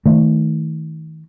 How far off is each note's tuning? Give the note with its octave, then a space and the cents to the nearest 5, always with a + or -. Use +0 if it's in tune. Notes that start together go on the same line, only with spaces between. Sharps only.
D#3 +30 A3 +0